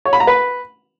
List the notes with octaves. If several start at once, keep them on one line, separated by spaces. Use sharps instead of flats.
C#5
B5
A#5
B4